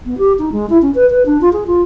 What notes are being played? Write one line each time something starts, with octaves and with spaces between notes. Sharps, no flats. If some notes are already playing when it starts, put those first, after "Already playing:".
B3
G4
D#4
G#3
E4
C#4
B4
B4
D4
F4
G#4
F4